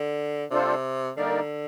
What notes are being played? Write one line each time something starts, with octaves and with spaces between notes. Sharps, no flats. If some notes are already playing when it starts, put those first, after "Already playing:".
Already playing: D3
C3 G3 D4 F4 A4 C5
D3 G3 A#3 D#4 A#4 D5